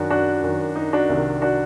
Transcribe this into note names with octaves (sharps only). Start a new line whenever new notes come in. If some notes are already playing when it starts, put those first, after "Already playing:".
Already playing: F#2 D#3 D4 F#4
D4 F#4
F#2 D#3
D#4
D4 F#4
C2 C3 D#3
D4 F#4